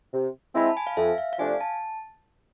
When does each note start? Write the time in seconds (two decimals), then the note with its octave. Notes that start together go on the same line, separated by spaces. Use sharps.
0.13 C3
0.55 G#3 C4 E4 B5
0.67 A5
0.77 G#5
0.87 F5
0.97 F2 E5
1.18 F5
1.33 F5
1.39 C3 F3 A3 D4 G#5
1.61 A5